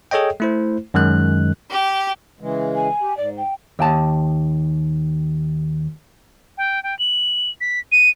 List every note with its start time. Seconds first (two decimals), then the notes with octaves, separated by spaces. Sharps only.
0.11 G#4 A4 C#5 D#5 G5
0.40 A3 E4 C5
0.94 F#2 D#3 G#3 F#6
1.70 G4
2.41 C#3 E3 G#3
2.75 G#5
3.01 G4
3.17 G#2 D5
3.37 G5
3.79 D#2 G5 A5
6.58 G5
6.83 G5
6.99 F#7
7.61 B6
7.92 D#7